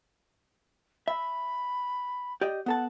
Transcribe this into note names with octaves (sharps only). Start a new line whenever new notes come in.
E5 B5
G4 D5 D#5
B3 A4 F#5 A5